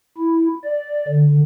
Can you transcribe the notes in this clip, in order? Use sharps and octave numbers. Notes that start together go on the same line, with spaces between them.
E4
D5
D3